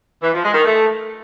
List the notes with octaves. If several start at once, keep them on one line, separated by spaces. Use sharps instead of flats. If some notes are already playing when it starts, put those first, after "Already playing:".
E3
F3
G#3
D#3
A3